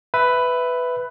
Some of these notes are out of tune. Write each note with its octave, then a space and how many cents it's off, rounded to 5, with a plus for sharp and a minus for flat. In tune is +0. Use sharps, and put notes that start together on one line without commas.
B4 +10 E5 +0